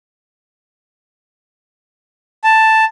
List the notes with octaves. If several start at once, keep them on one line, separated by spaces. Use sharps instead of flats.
A5